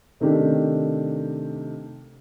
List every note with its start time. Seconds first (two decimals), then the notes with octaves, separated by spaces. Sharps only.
0.20 C3 D#3 A3 D4 G4